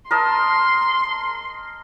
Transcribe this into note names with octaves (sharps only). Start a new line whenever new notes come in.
A#4 D#5 A5 C6